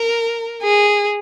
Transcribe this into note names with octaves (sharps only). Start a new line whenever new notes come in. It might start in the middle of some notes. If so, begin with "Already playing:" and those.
Already playing: A#4
G#4